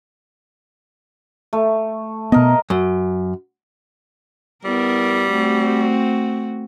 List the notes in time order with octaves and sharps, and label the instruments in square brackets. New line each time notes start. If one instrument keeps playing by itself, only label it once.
[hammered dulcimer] A3
[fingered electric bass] B2 B3 [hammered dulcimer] A#4 D#5
[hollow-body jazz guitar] F#2
[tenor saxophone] G3 [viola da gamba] B3 E4 A#4
[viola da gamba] A3 C4 F#4